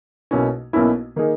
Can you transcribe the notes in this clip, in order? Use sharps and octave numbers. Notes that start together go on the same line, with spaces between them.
B1 B2 A#3 C#4 E4
B1 B2 A#3 C#4 E4
D#3 A#3 D#4 G#4